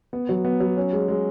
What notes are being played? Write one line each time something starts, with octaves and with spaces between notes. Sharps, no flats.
B3
F#3
B3
F#3
C#4
G#3
G#3